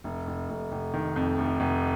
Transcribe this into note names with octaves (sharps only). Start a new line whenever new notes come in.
F1
F1
F1
F1
D#3
F2
F1
F1